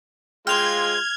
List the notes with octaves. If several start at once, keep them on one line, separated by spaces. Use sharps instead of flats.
G#3 F4 C5 F5 G5 F6 G#6 F7